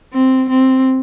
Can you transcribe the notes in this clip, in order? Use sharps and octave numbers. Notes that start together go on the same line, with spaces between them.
C4
C4